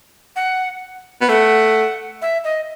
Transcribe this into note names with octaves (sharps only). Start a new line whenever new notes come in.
F#5
B3
A3 F#5
E5
D#5